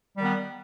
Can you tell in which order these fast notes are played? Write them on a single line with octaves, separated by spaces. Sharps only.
G3 D#3 B3